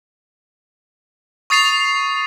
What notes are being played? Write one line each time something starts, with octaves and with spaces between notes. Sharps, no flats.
C#6 D#6 A6 C7 D#7 F7